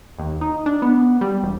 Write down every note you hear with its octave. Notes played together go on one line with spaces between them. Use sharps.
D#2
D#4
D4
B3
G3
E1